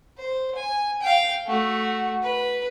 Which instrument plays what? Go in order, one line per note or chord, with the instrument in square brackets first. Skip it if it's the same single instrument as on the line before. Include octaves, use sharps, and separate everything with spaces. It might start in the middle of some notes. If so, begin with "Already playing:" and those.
[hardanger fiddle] C5
G#5
F5 G5
A3 F#4
B4